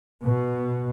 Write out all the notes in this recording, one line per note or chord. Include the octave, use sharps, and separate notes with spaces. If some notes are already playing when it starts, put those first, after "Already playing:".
B2